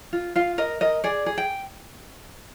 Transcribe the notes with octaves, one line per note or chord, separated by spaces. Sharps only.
F4
F4 F5
A#4 D#5
A#4 D#5
G#4 D5
G#4
G5